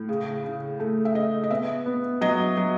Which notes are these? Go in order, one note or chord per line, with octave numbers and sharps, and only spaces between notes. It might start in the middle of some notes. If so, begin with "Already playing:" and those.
Already playing: A2
C#3
C#3
A3
E5
C#3 D#5
D#5
B3 E5
B3
F#3 D#5
F#3